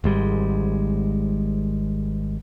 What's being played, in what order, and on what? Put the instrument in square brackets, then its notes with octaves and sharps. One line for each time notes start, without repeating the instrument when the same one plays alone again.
[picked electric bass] G#1 G#2 G3 G#3